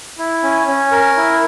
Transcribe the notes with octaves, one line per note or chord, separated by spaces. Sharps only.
E4
C#4
C#4
A#4
E4